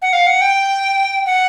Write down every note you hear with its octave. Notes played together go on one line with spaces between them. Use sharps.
F#5
F5
F#5
G5
F#5